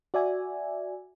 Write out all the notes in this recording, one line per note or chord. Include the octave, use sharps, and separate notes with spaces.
F#4 D5 E5 G#5